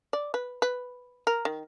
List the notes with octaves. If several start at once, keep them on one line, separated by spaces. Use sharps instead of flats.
D5
B4
B4
A#4
D#3